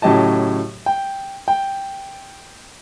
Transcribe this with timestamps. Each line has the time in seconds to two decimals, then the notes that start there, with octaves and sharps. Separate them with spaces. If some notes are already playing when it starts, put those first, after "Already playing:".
0.02 A2 C#3 F#3 G4 D#5 A5
0.86 G5
1.48 G5